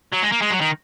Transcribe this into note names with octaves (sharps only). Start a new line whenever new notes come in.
F#3
G#3
A#3
G#3
F#3
D#3